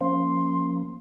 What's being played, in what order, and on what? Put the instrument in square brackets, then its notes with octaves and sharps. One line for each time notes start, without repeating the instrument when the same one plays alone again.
[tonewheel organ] F3 A#3 [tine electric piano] C#4 [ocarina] C6